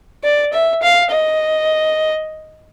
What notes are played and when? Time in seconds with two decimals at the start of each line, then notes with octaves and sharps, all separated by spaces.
0.24 D5
0.53 E5
0.82 F5
1.11 D#5